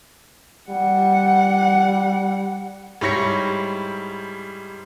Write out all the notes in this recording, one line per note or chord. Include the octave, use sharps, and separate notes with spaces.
G3 F#5
G#2 G3 E4 C#5 A#6 C#7